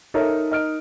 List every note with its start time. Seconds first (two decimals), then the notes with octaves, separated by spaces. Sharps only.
0.14 D#4 A4 A#4 C#5 E5
0.51 D#5 F6 D7